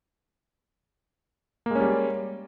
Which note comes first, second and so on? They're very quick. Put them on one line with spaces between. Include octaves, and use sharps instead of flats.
A#3 G#3 C#4 G3